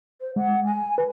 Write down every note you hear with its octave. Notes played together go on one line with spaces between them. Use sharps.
C5
G#3 F#5
G#5
B4